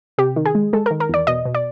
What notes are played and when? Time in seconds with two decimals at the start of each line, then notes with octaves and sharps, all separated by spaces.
0.18 C3 G4
0.36 D#3
0.45 G#4
0.55 G#3
0.73 G#3 A4
0.86 A#4
0.91 D#3
1.00 A#4
1.09 E2 D5
1.27 B2 D#5
1.45 B2
1.55 D5